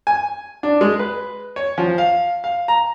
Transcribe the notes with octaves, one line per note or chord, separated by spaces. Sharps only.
G#5
D4
G#3
B4
C#5
F3
F5
F5
A#5